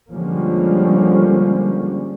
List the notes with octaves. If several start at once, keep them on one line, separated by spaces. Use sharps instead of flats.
D3 F3 G3 G#3 A#3 C#4